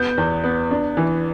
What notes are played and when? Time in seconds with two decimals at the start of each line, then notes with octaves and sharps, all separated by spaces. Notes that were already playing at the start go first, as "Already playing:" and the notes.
Already playing: B3 G6
0.18 E2
0.44 B3
0.71 D4
0.97 E3